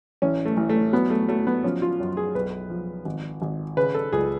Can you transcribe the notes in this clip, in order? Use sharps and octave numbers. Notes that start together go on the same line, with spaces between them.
A1 C#4
A3
A1
A3
F#3 B3
A3
F#3 A3
B3
F3 C#4
F4
F#2
G#4
B1 B4
F3
G#1
G#1
C#3 B4
A4
C#2 G#4